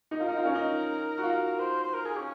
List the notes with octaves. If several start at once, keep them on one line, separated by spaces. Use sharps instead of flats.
D#4
F4 A#4
D#4
F4
C#4
D#4
F#4
F4
C5
C5
A#4
G#4
C#4